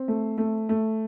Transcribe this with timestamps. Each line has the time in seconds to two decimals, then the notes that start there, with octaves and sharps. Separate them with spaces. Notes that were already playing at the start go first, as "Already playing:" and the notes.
Already playing: C4
0.08 A3
0.38 A3
0.69 A3